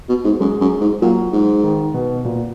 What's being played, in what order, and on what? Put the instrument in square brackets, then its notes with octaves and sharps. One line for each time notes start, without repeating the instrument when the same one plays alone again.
[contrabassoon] B2
G#2
[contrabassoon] F#2 [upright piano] G#3
[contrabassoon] F#2
G#2
[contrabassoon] A#2 [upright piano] F#3
[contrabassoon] G#2
[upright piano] D#3
B2
A#2